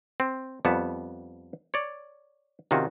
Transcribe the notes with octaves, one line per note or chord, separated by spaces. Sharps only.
C4
F2 G3 B3 F#5 A5
C#5 D5
C3 D#3 C#4 F4 F#4